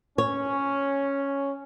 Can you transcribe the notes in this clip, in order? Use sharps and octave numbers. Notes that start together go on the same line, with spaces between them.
C#4 C#5